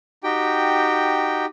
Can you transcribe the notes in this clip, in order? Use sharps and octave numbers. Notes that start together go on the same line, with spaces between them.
D#4 F#4 G4 G5